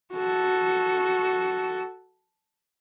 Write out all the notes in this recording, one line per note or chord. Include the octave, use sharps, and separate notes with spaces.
F#4 A4